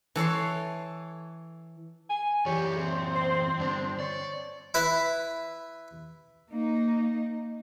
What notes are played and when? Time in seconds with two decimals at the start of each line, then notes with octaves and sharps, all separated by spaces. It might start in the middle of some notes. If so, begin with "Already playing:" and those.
0.16 E3 A4 C#5 C6
2.10 G#5
2.46 F#2 E3 G4 C#5 D5
2.79 C4
3.15 C5
3.59 G2 D3 D4
3.99 C#5 D5
4.74 E4 B4
6.51 A#3 D#4